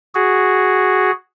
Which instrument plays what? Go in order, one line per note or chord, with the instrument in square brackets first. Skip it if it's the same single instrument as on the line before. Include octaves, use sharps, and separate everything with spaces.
[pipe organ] F#4 G#4